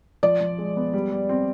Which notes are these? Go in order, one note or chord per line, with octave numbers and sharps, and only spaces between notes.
F3 D5
F3
G#3
B3
G3
G3
C4